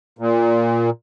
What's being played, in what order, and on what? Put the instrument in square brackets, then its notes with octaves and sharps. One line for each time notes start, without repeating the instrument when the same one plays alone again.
[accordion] A#2